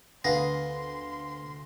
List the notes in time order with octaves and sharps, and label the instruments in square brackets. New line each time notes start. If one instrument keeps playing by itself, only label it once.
[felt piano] D2 F5 [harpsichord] B3 G#4 [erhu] C6 [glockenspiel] A#6